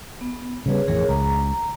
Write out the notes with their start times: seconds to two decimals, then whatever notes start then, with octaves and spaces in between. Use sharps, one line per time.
0.21 B3
0.66 C#3 G3 B3 G#4 B4 C#5
0.88 A1 F2 E3 G#4 A#4 C#5
1.09 C#2 A#5